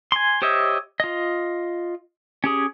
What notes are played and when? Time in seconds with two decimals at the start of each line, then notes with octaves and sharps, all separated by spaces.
0.12 G#5 C6
0.42 G4 C5 C#5 D#5 E5
1.00 F4 D#5
2.44 C#4 G4 G#4